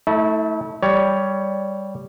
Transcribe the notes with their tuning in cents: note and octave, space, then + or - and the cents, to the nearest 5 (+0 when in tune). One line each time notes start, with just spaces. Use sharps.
A3 +0 E4 -40
G3 +0 C#5 +15